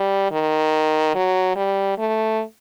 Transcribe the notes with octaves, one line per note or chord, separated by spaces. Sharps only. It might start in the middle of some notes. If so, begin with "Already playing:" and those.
Already playing: G3
D#3
F#3
G3
A3